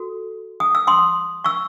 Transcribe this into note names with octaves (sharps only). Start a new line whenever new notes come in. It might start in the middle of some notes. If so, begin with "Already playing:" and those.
Already playing: F#4 A4
D#6
E6
C6 D#6
C#6 E6